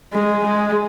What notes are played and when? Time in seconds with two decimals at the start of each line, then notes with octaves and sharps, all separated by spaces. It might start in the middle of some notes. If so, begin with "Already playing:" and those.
0.13 G#3
0.44 G#3